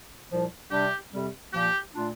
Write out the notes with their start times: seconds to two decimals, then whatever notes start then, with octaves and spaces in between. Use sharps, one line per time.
0.30 C2 A#2 F3
0.71 C3 G3 D4 G4
1.11 F2 C3 G3
1.53 A#2 F3 A#3 G4
1.94 A#2 A3 D4 F4